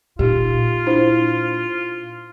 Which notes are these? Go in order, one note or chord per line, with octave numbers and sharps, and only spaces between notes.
A#2 D#4 F4 G4
D4 E4 C5